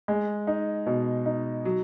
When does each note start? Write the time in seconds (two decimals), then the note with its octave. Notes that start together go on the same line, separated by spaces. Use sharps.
0.08 G#3
0.47 D#4
0.86 B2
1.26 D#4
1.65 F#3